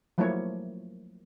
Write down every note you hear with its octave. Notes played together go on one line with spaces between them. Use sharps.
F3 F#3 A3 A#3 E4 C#5